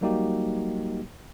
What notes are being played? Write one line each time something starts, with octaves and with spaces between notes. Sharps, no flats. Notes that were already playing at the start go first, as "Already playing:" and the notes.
F#3 G3 A#3 D#4 F#4 G4